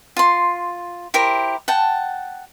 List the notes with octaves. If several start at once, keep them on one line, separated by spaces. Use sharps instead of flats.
F4 C6
E4 G4 A#4 C5
F#5 G5 A5